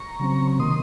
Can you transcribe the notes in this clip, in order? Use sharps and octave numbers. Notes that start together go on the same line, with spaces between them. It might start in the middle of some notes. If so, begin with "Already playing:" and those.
Already playing: A#5 C#6
C#3 F#3 C4
C3 D#3 A#3 C6 D#6